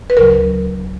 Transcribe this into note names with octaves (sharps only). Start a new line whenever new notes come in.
B4
D2 C#3 F#3 A#4